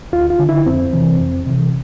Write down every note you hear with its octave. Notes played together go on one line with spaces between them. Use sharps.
D2 F4
F4
D3
E4
F2 C4
C3 E3
F2
C3 E3